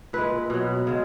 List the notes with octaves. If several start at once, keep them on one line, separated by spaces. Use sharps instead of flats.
A#2 G#3 B4
B2 F#3
C#3 G#3